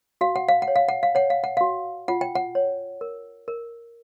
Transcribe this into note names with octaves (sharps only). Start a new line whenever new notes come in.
F#4 F5
F#5
F5
F#5
C#5
F5
F#5
F5
C#5 F#5
F5
F#5
F#4 F5
F4 F#5
G5
F#5
C#5
A#4
A#4